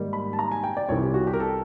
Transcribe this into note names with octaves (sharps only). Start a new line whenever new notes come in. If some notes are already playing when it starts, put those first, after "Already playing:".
Already playing: G#2 D#3 G3 A#3
B5
A5
A#5
G#5
G5
D5
C2 C3 E3 G3 C#5
G4
F#4
G4
A#4
A4